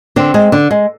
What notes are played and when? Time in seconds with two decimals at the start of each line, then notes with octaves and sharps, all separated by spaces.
0.16 D3 C4
0.34 G#3
0.52 D3
0.71 G#3